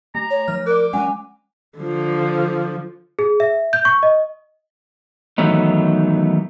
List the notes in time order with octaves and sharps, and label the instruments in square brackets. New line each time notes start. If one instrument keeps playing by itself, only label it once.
[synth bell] A3 [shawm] A#5
[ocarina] C#5
[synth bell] F3 F6
[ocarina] A#4 [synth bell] D5 F#6 [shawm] D6
[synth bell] G#3 C#4 F#5 [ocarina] G#5
[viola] D3 F3
[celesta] G#4
E5
G6
C#6
D#5
[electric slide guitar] D#3 E3 F#3 A3 B3 D#4